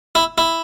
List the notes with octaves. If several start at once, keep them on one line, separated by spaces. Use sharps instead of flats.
E4
E4